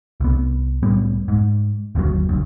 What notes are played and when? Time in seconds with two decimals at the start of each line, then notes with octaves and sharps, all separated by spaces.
0.20 C2 B3
0.83 C2 A2 G3 B3
1.28 G#2
1.95 G1 D#2 C3 F#3
2.29 F#1 D2